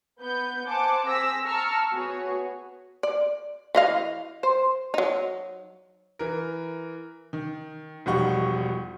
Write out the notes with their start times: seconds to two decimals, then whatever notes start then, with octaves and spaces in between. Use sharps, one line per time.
0.19 B3 B4 G6
0.66 C5 F#5 G#5 A5 D6
1.06 C4 G#4 C5 E6 A#6 B6
1.46 A5 A#5 C#6 E6 F6
1.92 B3 F#4 G#4 C#5
3.03 D5
3.75 E3 D#5 F5
4.43 C5
4.94 F#3 D#4
6.19 E3 A#4
7.33 D#3
8.06 E1 F3 G3 D#4 F#5 C#6